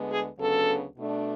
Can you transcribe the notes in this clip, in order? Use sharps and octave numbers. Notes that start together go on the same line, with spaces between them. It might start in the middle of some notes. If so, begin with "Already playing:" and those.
Already playing: D2 D3 G#3 B3
G#4
D2 C#3 F#3 B3 D4 A4
B2 A3 D4